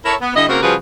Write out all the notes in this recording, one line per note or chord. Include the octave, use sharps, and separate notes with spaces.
E4 A4 A#4 C#5
B3
D3 G3 E4 D#5
C#3 A#3 C4 F#4 A#4
C#3 F3 G3 F#4 G#4 B4